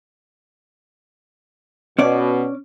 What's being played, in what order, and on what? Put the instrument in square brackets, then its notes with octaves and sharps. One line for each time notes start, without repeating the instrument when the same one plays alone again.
[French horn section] B2 [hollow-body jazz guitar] C#4 D5